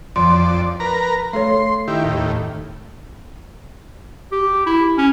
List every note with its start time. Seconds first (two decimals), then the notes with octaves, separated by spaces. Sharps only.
0.16 F2 F3 D5 C6
0.80 A#4 B4 A#5
1.33 A3 A4 C#5 C6
1.88 D#3 E4 G4
2.04 D#2 A2
4.32 G4
4.66 E4
4.98 C#4